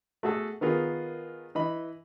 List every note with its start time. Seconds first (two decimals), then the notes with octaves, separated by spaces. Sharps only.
0.23 A3 F#4 G#4 A4
0.61 D#3 B3 F4 G#4 A#4
1.55 E3 D#5 B5